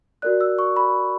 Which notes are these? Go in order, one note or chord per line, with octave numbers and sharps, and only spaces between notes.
F#4 A#4 D5 F#6
E6
C#6
B5